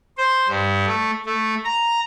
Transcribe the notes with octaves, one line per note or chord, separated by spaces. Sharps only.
C5
G2
A3
A3
A#5